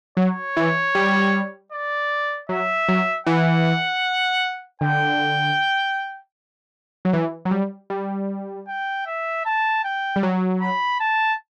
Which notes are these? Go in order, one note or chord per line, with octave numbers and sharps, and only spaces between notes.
F#3 C#5
E3
G3
D5
F#3 E5
F#3
E3 F#5
D3 G5
F#3
E3
F#3
G3
G3
G5
E5
A5
G5
G3
F#3
B5
A5